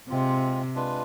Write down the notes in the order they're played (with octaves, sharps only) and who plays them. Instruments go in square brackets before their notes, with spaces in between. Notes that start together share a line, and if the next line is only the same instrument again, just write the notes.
[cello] C3 [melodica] G#3 C4 F4
[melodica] G#3 D4 F4 B4